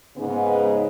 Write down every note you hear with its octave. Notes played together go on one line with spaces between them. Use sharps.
G#2 C#3 B3